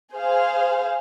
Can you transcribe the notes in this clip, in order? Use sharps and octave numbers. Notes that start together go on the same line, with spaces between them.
G#4 C5 F5